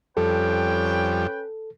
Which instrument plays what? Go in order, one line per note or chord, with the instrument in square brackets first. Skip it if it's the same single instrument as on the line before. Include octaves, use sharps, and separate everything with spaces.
[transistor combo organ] F2 G3 [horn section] C#4 B4 G5 [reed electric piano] A4